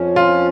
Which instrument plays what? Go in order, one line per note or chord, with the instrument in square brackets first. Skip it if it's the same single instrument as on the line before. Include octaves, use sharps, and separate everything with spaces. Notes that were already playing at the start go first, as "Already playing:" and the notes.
Already playing: [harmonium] F2 F3 C#4
[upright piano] F4